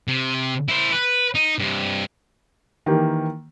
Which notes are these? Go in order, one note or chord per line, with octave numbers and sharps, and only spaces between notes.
C3
E4 C5
B4
D#4
G2 C3
D#3 E3 A#3 G4